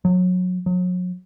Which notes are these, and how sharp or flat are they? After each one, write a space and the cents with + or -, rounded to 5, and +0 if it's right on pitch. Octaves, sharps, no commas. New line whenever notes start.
F#3 -25
F#3 -40